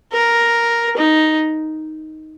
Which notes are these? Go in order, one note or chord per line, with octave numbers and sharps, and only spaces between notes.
A#4
D#4